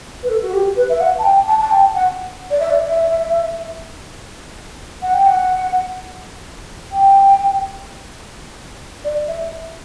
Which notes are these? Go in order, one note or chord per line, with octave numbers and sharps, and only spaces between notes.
B4
A4
F#4
G4
B4
E5
F#5
A5
G5
A5
A5
G5
F#5
D5
E5
D5
E5
F#5
G5
F#5
G5
D5
E5